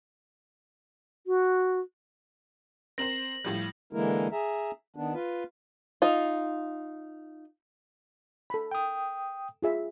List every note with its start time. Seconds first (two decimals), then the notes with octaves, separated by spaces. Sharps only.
1.27 F#4
2.98 C4 A#4 C5 A#6 F#7
3.44 A2 F3 G3
3.93 D3 E3 G#3 A#3 E4 A#4
4.32 G#4 E5 A#5
4.96 D#3 B3 D4
5.14 F4 B4
6.02 D#4 F4
8.50 A4 B5
8.71 G5 D#6
9.62 F4 G#4 E5